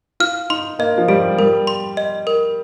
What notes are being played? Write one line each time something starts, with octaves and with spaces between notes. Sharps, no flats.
F4 F6
D#4 C6
A#3 D#5
F3
G3 G4
G3 A#4
C6
D#5
A#4